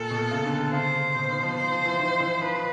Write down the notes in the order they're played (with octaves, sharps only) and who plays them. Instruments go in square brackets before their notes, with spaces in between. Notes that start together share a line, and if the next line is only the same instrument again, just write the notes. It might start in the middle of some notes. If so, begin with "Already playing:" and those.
Already playing: [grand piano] A#2 [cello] A4
[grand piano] B2
C#3
D3
D3
[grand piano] C#3 [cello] C5
[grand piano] B2
D#3
F3
[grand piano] F3 [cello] C5
[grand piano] F3
E3
D#3
E3
[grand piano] F3 [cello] B4
[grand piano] D#3